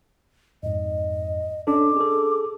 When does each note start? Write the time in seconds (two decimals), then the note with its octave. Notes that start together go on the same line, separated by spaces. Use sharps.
0.63 F2 G#2 D#5
1.67 C#4 D4 A4 D6
1.96 G#4 A4